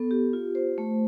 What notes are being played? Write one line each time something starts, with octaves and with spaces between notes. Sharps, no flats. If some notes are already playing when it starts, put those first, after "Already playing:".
Already playing: B3 A4
G4
F4
C5
A3